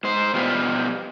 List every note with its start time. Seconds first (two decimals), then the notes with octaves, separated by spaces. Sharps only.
0.03 G#2 C5
0.34 B2 F3 G3 F4 G4